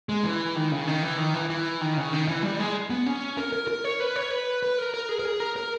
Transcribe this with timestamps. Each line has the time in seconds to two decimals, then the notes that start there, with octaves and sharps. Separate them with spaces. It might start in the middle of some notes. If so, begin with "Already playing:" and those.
0.09 G#3
0.24 E3
0.56 D#3
0.71 C#3
0.87 D#3
1.02 E3
1.18 D#3
1.34 E3
1.50 E3
1.81 D#3
1.97 C#3
2.13 D#3
2.28 E3
2.43 G3
2.59 G#3
2.90 B3
3.06 C#4
3.38 A#4
3.52 A#4
3.68 A#4
3.84 C#5
4.00 B4
4.16 C#5
4.31 B4
4.63 B4
4.78 A#4
4.94 A#4
5.09 G#4
5.19 A#4
5.25 G#4
5.40 A#4
5.56 A#4